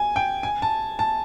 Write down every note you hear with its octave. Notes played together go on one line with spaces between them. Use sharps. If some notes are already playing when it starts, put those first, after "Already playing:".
Already playing: G#5
G5
G#5
A5
A5